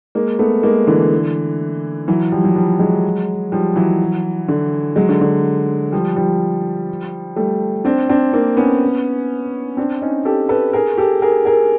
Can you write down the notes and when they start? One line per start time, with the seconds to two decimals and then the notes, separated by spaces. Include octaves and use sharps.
0.15 G#3 A#3
0.39 A3 B3
0.63 G#3 A#3
0.87 D3 E3
2.08 E3 F#3
2.32 F3 G3
2.44 F#3
2.56 F3 G3
2.79 F#3 G#3
3.52 F3 G3
3.76 E3 F#3
4.48 D3
4.96 F#3 G#3
5.09 D3
5.21 D3
5.92 F3 G3
6.16 F3 G3
7.36 G3 A3
7.85 C4 D4
8.09 C4 D4
8.33 A#3 C4
8.57 B3 C#4
9.77 C4 D4
10.01 C#4 D#4
10.25 G4 A4
10.49 A4 B4
10.73 G#4 A#4
10.98 G4 A4
11.22 G#4 A#4
11.45 G#4 A#4